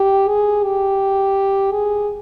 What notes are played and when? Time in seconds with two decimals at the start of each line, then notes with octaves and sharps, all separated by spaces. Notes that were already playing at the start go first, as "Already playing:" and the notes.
Already playing: G4
0.29 G#4
0.64 G4
1.72 G#4